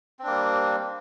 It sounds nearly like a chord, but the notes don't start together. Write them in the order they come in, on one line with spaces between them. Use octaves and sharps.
C4 D4 A#3 G3